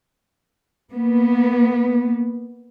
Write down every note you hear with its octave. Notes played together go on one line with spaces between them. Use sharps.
A#3 B3